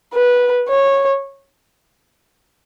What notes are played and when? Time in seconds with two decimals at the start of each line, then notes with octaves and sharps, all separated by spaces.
0.14 B4
0.69 C#5